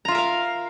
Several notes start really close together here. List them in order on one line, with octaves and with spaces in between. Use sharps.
A#5 F4 E5 A#4 F5